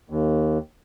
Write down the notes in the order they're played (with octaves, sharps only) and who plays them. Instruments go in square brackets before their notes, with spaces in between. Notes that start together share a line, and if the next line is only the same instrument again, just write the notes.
[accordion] D#2